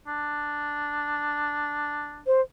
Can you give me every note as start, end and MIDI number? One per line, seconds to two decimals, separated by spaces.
0.07 2.22 62
2.27 2.41 72